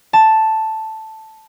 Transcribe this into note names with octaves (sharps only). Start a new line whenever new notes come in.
A5